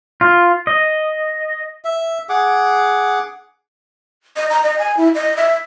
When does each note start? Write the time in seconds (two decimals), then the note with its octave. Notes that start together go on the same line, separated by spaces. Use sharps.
0.21 F4
0.67 D#5
1.85 E5
2.29 G#4 F#5 D6
4.37 D#5
4.50 A#5
4.63 D#5
4.79 G#5
4.97 E4
5.15 D#5
5.37 E5